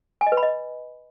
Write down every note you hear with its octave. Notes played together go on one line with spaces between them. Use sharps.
G#5
D#5
B4
B5
D#5